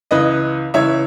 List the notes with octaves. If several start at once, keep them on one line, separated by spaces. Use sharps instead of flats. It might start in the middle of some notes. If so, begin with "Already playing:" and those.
C#2 C#3 E3 B4 D#5
C#2 C#3 E3 C#5 E5